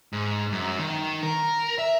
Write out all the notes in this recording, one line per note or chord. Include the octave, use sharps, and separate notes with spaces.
G#2
F#2
D#3
A#4
E5